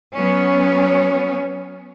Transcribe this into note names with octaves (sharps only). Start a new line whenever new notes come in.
F#3 B3 C#4